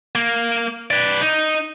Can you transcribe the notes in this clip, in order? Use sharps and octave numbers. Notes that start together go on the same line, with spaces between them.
A#3
B4 D5
D#4